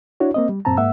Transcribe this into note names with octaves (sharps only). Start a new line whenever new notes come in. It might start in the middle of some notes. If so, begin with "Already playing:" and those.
D4 E4 F#4 C#5
A#3 C4 D#5
G3
F#2 A#2 C4 A5 A#5
G#2 A#3 E5 F#5 E6